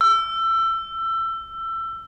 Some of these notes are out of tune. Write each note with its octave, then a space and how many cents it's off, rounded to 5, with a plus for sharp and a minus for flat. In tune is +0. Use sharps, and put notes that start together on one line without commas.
E6 +25